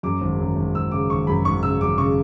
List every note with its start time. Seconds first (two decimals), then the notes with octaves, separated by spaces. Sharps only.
0.03 F#2 D6
0.21 G#1
0.39 F#2
0.56 G#1
0.74 G#1 E6
0.92 C#3 D6
1.10 G#1 C#6
1.27 F#2 B5
1.45 G#1 C#6
1.63 C#3 E6
1.80 F#2 D6
1.98 C#3 C#6